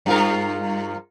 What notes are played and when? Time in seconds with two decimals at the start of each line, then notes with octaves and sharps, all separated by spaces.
0.06 G2 F4 A#4